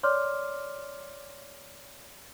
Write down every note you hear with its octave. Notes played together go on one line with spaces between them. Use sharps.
C#5 D5 C6 D6 F6